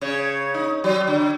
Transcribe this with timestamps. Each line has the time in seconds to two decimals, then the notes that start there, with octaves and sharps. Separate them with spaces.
0.01 C#3 C#5
0.54 D#4
0.84 F#3
1.07 D3